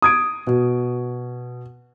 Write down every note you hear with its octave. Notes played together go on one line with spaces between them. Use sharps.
D#6 G#6 D7
B2